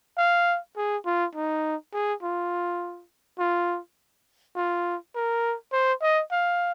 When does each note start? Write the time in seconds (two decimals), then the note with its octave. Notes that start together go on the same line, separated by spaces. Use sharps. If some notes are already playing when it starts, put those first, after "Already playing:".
0.18 F5
0.77 G#4
1.06 F4
1.35 D#4
1.93 G#4
2.23 F4
3.39 F4
4.56 F4
5.15 A#4
5.73 C5
6.02 D#5
6.31 F5